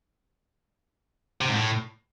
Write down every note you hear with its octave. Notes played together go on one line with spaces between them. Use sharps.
C3
G#2
A2